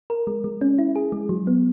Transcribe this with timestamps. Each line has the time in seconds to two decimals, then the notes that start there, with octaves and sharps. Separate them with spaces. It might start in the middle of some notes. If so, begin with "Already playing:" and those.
0.10 A#4
0.27 G#3
0.44 G#3
0.61 C#4
0.78 E4
0.96 G#4
1.12 G#3
1.29 F#3
1.47 B3